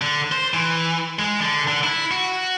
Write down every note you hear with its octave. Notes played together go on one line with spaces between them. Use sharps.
D3
C5
E3
G#3
D3
D3
E4
F#4